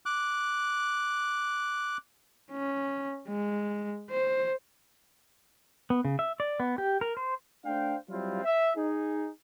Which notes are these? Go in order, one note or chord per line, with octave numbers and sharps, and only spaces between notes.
D6 F#6
C#4
G#3
C5
B3
C#3
E5
D5
B3
G4
A#4
C5
A3 D4 C5 F5 G5
F#3 G3 C4 E4 F4 F5
E5
D#4 G#4